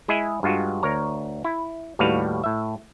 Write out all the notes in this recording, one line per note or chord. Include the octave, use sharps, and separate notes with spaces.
G#3 E4 G#4 D#5 E5 G#5
G2 G#3 F4 F#4
D2 A#4 C#5 A#5
E4
D#2 A2 G3 F#4 B4 F5
A2 E5